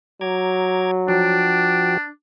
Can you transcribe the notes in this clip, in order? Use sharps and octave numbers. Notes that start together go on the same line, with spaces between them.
F#3 A#5 D6 G#6
F3 D4 F#4 G5